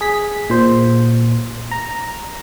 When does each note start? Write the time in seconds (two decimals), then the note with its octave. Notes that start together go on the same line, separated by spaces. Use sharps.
0.01 G#4 B6
0.50 A#2 C5
1.71 A#5